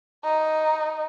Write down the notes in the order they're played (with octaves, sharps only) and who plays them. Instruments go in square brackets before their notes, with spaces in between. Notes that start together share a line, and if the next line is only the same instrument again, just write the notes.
[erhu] D#4